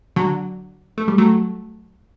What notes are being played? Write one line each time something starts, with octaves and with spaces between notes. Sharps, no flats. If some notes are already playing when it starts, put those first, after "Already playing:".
D3 F#3
A3
G3
F#3 A3